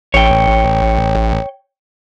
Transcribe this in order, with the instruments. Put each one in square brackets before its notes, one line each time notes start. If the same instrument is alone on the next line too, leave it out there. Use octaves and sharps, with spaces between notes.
[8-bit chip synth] A1 [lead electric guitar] C#5 G5